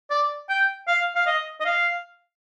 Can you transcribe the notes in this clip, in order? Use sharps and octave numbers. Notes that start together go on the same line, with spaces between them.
D5
G5
F5
F5
D#5
D#5
F5